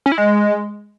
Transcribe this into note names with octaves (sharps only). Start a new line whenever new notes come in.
C#4
E4
G#3